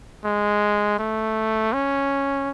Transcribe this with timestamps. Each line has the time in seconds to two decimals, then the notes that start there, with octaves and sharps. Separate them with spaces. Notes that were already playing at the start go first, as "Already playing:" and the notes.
0.25 G#3
0.99 A3
1.73 C#4